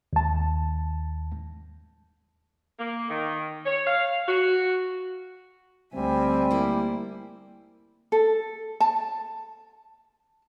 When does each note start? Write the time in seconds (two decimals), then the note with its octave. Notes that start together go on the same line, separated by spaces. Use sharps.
0.13 D#2 A5
2.79 A#3
3.09 D#3
3.66 C#5
3.87 F5
4.28 F#4
5.94 D2 G3 C4 E5 G#5
6.51 A#3 E4 C5
8.12 A4
8.80 A5